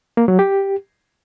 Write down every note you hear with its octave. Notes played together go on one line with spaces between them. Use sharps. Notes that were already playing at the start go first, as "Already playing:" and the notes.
A#3
F#3
G4